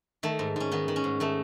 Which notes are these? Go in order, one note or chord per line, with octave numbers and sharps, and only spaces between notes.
D#3 A3
G#2
G#2 C#4
D#3 B3
D#3
C#4
G#2
D#3 A3